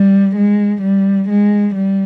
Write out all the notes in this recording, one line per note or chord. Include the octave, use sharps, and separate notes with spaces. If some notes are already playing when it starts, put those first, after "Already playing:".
Already playing: G3
G#3
G3
G#3
G3